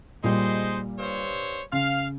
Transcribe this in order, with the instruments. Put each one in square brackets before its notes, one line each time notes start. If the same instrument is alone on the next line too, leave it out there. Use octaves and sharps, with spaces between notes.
[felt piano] A#2 G3 [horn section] G#3 D#4 C5
[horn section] G2 C5 C#5
[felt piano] C#3 [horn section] F5